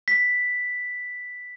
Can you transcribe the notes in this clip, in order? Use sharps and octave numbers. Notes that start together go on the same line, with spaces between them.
B6